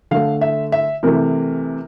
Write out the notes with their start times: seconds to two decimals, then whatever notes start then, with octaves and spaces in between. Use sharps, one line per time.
0.11 D3 A3 F5
0.41 E5
0.72 E5
1.03 C3 E3 A3 A#4